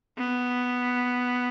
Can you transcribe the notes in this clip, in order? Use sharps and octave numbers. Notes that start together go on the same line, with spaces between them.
B3